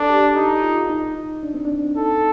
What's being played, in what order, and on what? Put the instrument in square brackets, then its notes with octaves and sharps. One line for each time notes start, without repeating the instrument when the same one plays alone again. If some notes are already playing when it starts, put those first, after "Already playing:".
Already playing: [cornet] D4 [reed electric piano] A4
[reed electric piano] G4
[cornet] D#4
[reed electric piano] F4
D#4
D4
C4
D4
[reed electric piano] D#4 [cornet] A4